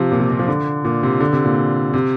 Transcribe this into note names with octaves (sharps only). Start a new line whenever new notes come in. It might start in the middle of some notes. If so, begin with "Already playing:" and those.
Already playing: C3 F3
A#2
C3
C3
F3
D3
A#2
C3
D3
C3
A#2
C3